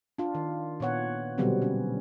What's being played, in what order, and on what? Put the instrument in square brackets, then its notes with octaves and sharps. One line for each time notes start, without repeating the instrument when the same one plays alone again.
[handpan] D4 F4
D#3
A#2 B3 C#5 F#5
B2 D3 F#3 G3 B3 C4
C#4